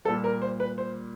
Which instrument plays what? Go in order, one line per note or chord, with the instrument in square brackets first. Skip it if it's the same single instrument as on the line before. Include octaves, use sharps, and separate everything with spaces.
[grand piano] G3 A4
A#2
A#4
C5
B4
C5